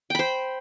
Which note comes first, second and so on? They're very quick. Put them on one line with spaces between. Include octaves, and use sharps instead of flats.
G5 B5 C5